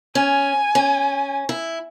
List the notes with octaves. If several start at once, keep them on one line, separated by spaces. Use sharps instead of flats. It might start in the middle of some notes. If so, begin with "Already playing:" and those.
C#4 G#5
C#4
E4